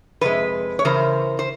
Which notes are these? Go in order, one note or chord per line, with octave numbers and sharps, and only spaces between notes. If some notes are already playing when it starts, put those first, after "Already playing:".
F2 C3 G#3 B4
C#5
C#3 E3 A#4 C5
C5